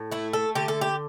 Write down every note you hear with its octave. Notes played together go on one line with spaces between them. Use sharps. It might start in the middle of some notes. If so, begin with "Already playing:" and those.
Already playing: A2
A3 E4
A4
D3 G4
A4
G4